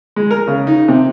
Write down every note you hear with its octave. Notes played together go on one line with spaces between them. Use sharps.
G#3
A#4
C#3
D#4
C3